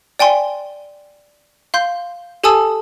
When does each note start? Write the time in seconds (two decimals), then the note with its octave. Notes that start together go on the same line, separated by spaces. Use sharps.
0.19 D5 G5 G#5 C6
1.74 F5 C6 G6
2.44 G4 A4 G#5 A5 D#6 E6